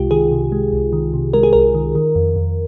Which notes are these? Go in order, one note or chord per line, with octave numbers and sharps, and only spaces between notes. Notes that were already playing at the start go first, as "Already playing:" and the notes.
Already playing: C2 C3 G#3 F4 G4
D#3 G#4
C3
G#3
C2
D#3
C3
G#3 A#4
G#4
C2 A#4
D#3
D#3
F2
F2